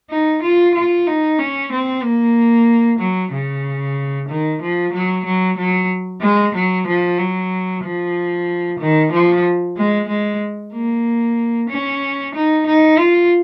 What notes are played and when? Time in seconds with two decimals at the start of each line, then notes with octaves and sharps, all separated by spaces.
0.10 D#4
0.42 F4
0.74 F4
1.07 D#4
1.39 C#4
1.72 C4
2.03 A#3
2.99 F#3
3.32 C#3
4.29 D#3
4.62 F3
4.93 F#3
5.25 F#3
5.57 F#3
6.21 G#3
6.54 F#3
6.87 F3
7.19 F#3
7.83 F3
8.79 D#3
9.12 F3
9.77 G#3
10.08 G#3
10.73 A#3
11.69 C#4
12.35 D#4
12.67 D#4
12.99 F4